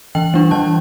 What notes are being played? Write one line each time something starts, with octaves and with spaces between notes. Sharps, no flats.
E3 G5
G3 D4
E3 A5